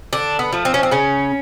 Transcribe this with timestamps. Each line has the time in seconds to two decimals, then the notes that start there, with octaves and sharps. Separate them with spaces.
0.13 D3 D4
0.39 B3
0.52 F3 A3
0.65 C4
0.74 C#4
0.83 C4
0.91 C#3 C#4